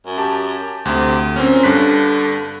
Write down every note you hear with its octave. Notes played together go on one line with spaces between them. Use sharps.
F#2
G4 A5
D2 C3
A#2 C4 C#4
G2 D3 F#6 B6